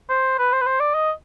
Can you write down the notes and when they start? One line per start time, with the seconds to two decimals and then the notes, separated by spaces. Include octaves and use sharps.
0.10 C5
0.39 B4
0.53 C5
0.61 B4
0.67 C5
0.80 D5
0.94 D#5